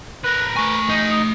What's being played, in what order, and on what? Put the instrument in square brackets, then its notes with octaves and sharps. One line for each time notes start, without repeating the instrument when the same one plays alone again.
[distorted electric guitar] A#4 B4 [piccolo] F#6
[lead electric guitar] A3 G#5 [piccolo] C#6
[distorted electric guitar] D#4
[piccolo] D#6